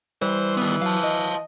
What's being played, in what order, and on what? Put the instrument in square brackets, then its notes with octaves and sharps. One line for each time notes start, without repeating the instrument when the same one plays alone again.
[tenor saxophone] E3 [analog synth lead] G3 [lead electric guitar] C5
[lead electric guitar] D#3 B3
[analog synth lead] F#3 [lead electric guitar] F5 A5
[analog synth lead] D#5